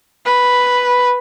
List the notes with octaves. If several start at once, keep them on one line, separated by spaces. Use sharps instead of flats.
B4